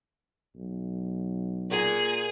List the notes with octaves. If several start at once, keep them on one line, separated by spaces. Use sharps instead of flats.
B1
A#2 G#4